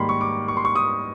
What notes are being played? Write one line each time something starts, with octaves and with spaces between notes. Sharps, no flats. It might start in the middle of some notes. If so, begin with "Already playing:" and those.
Already playing: G#2 D#3 G3 A#3 B5 C6
C#6
D6
C#6
C6
C#6
D#6